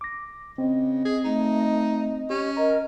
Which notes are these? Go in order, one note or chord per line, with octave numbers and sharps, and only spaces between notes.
D6 A#6
C#3 C4 D#5
G#4
A3 D#4
C#4 G4
A#4 D#5 A#5